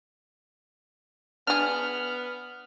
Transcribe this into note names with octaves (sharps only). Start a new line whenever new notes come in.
B3 D4 G#4 F6